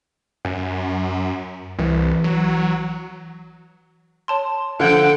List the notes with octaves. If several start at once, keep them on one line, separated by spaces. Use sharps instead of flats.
F#2
C2 E3
F#3
C#5 A5 C6
D3 F3 A4 F#5 G5 F#6 G#6